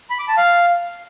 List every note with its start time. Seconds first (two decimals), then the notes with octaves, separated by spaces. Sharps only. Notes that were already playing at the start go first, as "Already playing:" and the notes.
0.10 B5
0.19 D6
0.28 A5
0.37 F5